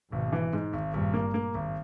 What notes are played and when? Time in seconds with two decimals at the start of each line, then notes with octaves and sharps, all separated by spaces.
0.12 G#1 G#2 B2
0.33 E3
0.53 G#2
0.73 G#1
0.93 G#1 G2 A#2
1.14 A#3
1.34 A#3
1.54 G#1